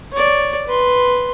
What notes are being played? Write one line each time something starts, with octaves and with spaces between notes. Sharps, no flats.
C#5 D5
B4 C6